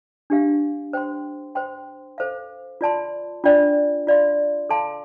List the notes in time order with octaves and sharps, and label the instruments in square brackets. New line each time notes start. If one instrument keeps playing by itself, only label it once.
[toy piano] D4 G4 F5
C5 G5 C6
C5 G5 C6
A4 C5 F5
F4 D5 A5 C6
D4 F4 D5 G5
F4 D5 F5 C6
A4 F5 A5 C6